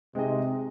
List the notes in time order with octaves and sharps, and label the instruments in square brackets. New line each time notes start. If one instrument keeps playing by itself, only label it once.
[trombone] C3 [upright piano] G#3 C4 D#4 G#4 D#5